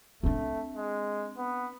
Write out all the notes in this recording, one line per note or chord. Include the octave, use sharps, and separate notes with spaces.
A3 C4 D4
G#3
B3